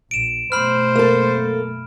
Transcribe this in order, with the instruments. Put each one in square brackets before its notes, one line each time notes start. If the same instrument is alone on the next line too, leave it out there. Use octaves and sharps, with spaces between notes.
[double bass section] A#1 [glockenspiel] D7 E7
[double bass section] F#2 B2 A3 [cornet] C5 [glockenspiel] B5 F6
[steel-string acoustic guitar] A#3 A4